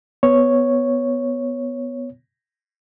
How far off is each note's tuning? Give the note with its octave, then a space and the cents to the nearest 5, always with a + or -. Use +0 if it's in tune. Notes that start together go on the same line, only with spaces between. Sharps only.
B3 +5 C#5 +0